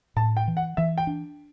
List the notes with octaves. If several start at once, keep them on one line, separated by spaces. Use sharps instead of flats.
A2 A5
G5
E3
F#5
E3 E5
G5
D4